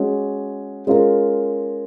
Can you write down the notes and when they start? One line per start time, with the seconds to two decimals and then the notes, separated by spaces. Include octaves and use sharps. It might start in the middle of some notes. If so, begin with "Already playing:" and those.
Already playing: G#3 C#4 F#4
0.87 G#3 C#4 F4 A#4